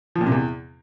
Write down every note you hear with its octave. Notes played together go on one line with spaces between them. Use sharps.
F3
A#2
C3
E2